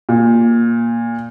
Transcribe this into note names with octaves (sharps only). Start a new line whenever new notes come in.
A#2